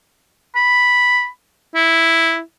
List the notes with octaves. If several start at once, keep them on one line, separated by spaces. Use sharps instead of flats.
B5
E4